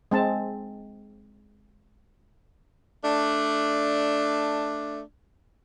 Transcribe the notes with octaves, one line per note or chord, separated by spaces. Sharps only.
G#3 C4 A5
A3 D4